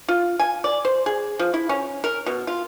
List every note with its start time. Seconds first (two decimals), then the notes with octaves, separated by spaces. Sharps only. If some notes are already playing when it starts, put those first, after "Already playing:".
0.09 F4
0.40 G#5
0.64 D5
0.85 C5
1.06 G#4
1.39 F3
1.54 E4
1.69 C#4
2.04 A#4
2.26 B2
2.47 F4